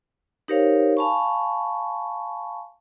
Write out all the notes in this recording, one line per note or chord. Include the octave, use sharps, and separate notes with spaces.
D#4 G4 A#4 C5 C#5 F5
F5 G#5 A5 B5 C#6